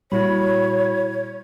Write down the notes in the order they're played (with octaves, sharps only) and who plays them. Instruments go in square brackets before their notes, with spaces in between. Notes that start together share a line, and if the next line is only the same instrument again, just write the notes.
[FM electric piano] A#2 G3 [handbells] E4 F#4 B5 [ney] C#5